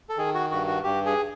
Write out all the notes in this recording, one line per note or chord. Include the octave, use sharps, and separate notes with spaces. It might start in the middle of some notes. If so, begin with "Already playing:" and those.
A4
D#3 G#4
F#4
G2 F#4
F#4
G2 G4
G#4